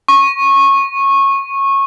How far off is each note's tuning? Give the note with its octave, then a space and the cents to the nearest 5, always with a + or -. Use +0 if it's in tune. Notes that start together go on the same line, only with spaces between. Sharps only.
C#6 -20